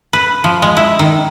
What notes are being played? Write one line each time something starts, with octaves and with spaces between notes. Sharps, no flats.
B4
F3
G#3
E4
D#3